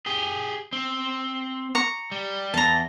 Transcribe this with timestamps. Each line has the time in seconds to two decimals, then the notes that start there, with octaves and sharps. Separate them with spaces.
0.06 G4 G#4
0.73 C4
1.75 A#5 C#6
2.12 G3
2.54 E2 A5 A#5